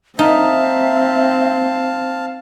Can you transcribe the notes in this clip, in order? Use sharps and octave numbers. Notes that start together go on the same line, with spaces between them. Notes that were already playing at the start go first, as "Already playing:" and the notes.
C4 D#4 E5 F5 A5